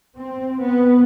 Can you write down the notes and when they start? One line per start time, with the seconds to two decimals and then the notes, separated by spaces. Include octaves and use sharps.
0.16 C4
0.61 B3